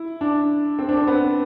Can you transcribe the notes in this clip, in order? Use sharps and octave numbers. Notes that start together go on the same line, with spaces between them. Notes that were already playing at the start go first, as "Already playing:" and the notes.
Already playing: E4
D4
C4
D4
C4
B3